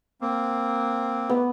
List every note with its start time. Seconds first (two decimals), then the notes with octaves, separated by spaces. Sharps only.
0.21 A#3 C4
1.29 B3